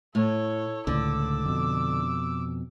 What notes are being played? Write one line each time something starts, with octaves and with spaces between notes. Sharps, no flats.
A2 A4 C#5
C#2 A2 D3 D6 E6
F2 B2